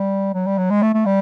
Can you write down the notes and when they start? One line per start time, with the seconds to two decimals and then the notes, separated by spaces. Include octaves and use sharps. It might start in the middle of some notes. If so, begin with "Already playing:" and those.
Already playing: G3
0.35 F#3
0.47 G3
0.58 F#3
0.71 G#3
0.83 A3
0.94 A3
1.06 G3